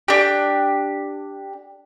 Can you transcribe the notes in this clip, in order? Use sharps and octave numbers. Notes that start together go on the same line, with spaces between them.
D4 G4